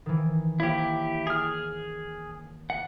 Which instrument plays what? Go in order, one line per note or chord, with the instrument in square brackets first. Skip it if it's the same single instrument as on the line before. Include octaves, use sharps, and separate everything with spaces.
[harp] D#3 E3
[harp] A#3 C#5 [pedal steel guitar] E4 G4
[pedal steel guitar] G#4 F6
F#5